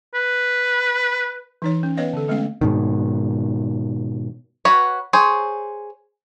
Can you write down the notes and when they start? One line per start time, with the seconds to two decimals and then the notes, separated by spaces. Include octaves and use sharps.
0.15 B4
1.62 E3 D#4 C#5
1.83 C#4
1.97 B3 B4 C#5 D#5 F5
2.13 D3 A4
2.28 G#3 A3 B3 C#4 F5
2.61 G#2 B2 D#3
4.65 F#4 B4 C#5
5.13 G#4 C5 C#5